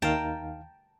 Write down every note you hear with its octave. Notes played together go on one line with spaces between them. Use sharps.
D#2 D#3 F5 G5 A5 A#5